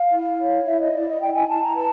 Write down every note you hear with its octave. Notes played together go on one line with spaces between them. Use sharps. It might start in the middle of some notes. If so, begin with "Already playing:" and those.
Already playing: F5
E4
C#5
E4 E5
D#5
E4 D5
D#5
E4 G5
G#5
E4 A5
A#5
B4 A5